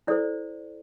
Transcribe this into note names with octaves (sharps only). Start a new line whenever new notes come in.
E4 A4 C5 D5